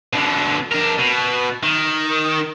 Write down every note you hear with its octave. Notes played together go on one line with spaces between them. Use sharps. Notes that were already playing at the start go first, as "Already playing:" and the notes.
B2 D3
D4 A#4
B2
D#3